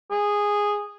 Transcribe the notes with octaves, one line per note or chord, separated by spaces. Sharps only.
G#4